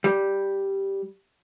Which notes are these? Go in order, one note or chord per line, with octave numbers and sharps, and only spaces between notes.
G3